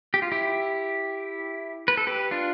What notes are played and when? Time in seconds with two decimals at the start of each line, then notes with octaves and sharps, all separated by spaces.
0.14 G4
0.22 F4
0.32 E4 G4
1.88 B4
1.97 A4
2.07 G4 B4
2.31 D4 F4